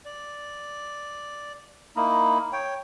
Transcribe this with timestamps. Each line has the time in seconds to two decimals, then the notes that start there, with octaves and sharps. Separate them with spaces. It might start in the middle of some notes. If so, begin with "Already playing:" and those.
0.05 D5
1.96 A#3 D#4 E4
2.53 C#5 G5